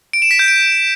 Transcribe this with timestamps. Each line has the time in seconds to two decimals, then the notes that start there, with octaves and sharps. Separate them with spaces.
0.13 D7
0.22 E7
0.31 B6
0.39 G6
0.48 D7